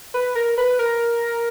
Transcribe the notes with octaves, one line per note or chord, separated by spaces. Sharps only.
B4
A#4
B4
A#4